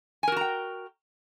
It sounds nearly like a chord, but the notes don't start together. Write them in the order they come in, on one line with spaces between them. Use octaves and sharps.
G#5 A#4 F#4 A#5 G5